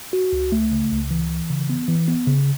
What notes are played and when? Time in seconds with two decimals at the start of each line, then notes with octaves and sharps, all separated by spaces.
0.13 F#4
0.33 C#2
0.52 A3
0.71 C#3
0.91 C#2
1.11 E3
1.30 E3
1.50 C#3
1.69 B3
1.89 E3
2.08 B3
2.27 C#3